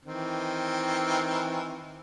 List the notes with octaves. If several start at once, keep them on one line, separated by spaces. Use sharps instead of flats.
D#3 E3 C4